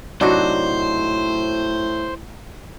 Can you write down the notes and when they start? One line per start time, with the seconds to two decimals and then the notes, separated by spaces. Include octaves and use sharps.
0.21 A2 C3 F#3 D4 D#4 F#4 C5